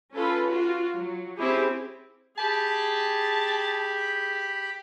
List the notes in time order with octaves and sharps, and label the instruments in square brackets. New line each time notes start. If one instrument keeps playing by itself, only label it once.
[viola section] C#4 F4 A4 B4
F4 F#4
F#3
C4 C#4 E4 G4 G#4
[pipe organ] G4 B5 [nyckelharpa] G#4 [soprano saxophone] A5